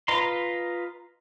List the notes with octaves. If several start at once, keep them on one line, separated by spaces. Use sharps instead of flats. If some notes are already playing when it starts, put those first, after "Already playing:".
F4 B4 D#5 A#5 C6